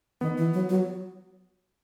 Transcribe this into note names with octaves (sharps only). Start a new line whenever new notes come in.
D#3 B3
E3
F#3
F#3